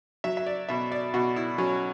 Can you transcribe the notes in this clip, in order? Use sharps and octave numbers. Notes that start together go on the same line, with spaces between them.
F#3 E5
E5
D5
B2 E5
D5
B2 F#4
E4
F#3 C#4